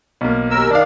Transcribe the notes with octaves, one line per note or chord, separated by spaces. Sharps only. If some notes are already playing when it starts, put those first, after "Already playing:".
B1 A#3
D#2 A#4 E6
D#3 D4 D5 F5